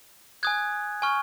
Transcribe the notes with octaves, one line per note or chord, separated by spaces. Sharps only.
G#5 D#6 F#6 G#6
G#5 C#6 F6